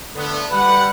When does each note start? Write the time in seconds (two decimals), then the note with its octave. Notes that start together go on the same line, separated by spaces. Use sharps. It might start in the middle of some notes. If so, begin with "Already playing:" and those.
0.15 D3 A3 B3
0.51 G3 B4 F#5